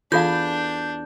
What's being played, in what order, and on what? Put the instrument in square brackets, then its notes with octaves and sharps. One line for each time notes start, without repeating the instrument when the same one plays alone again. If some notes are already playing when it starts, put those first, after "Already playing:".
[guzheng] E2 [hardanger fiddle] D4 [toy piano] F4 A4 F5 [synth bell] G6